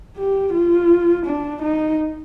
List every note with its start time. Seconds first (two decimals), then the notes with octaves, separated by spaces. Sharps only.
0.18 G4
0.54 F4
1.26 D4
1.62 D#4